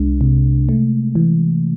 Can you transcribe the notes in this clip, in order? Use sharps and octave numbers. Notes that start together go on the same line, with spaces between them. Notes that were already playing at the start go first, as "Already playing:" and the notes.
Already playing: C2 G#3 D4
C3
A3
E3